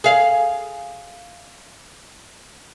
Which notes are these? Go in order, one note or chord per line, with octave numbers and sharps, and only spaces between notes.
G#4 F5